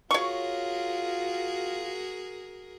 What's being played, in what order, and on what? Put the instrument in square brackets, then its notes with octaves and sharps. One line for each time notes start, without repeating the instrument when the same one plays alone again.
[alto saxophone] F4 [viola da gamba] F#4 G#4 A#4 [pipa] C#5 C#6